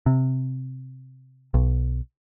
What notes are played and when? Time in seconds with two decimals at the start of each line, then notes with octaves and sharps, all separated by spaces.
0.06 C3
1.54 B1